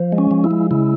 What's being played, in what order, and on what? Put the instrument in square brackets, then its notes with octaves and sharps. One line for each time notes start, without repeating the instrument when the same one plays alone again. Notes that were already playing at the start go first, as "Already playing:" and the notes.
Already playing: [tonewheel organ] F3
G#3
C#4
F3
E4
G#3
C#3 E4